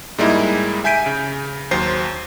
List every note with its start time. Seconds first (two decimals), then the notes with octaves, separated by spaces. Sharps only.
0.18 G#2 G3 G#3 A#3 D#4 E4
0.84 E5 G#5 G6 B6 D7 D#7
1.06 C#3
1.71 D#2 F#3 C5 C7